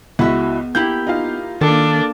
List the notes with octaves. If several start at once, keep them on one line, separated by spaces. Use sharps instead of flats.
C#2 B3 E4 F#4 E5
A#3 E4 G4 G6
D#4 F4 F5
D#3 A#3 D4 A4